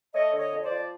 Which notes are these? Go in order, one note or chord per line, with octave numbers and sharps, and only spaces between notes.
A3 C#5 D#5
D3
C#5 D#5
F2
C5 D5
F3